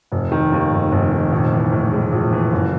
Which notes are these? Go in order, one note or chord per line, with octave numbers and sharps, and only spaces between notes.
F1
D#3
D#2
F1
F1
D#3
A#1
E3
A2
G#3
A#1
E3
F#1